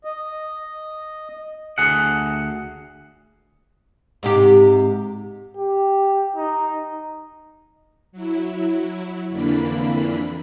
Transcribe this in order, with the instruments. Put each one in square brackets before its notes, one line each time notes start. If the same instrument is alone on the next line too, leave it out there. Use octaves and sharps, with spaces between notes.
[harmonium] D#5
[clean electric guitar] D2 G#4 F#5
[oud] G#2 C3 G4
[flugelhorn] G4
D#4
[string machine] F#3 E4
F2 D3 E3 A#3 D4 B5